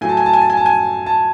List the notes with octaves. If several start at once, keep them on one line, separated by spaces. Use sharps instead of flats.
A2 F#3 G#5
A5
G#5
A5
G#5
A5
G#5
A5
G#5
A5